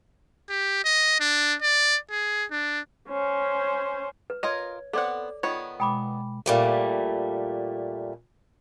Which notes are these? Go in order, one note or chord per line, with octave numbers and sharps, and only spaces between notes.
G4
D#5
D4
D5
G#4
D4
C#4 C5
B4
F4 A#4 C#5 D#5 G#6
B3 C4 A4 D5 F#5 D6
D#3 B3 F4 C#5
B2 G#3 G5 B5 D6
A#2 G3 A3